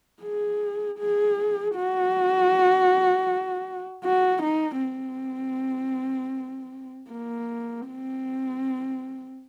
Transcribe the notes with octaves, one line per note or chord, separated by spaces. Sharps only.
G#4
G#4
F#4
F#4
D#4
C4
A#3
C4